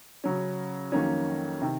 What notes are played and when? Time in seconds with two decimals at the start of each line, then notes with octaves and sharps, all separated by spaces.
0.24 C#3 F#3 C#4
0.92 F2 D#3 F#3 A#3 C#4
1.62 C3 D#3